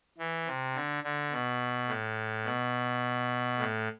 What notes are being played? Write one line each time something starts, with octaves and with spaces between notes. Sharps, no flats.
E3
C3
D3
D3
B2
A2
B2
A2